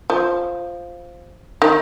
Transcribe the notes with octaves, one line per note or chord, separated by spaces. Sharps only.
F3
D#3